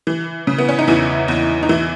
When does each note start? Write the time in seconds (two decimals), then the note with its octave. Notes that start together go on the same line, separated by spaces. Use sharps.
0.07 E3
0.47 C#3
0.58 B3
0.69 C#4
0.79 D#4
0.87 E2 E3 E4
1.28 E2
1.63 D#4
1.69 E3 E4